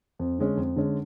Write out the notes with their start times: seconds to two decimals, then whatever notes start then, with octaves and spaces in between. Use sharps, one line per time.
0.19 F2
0.39 D3 G#3 C#4
0.57 F2
0.76 D3 G#3 C#4